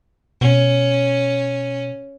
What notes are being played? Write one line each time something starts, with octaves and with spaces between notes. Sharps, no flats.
B2 C#4